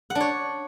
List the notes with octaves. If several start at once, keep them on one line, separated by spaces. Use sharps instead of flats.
F#5
D4
C#5